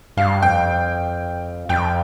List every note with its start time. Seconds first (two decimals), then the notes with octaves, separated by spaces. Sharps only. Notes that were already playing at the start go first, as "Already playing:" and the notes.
0.17 G2 F5
0.42 F2 G5
1.69 F2 G5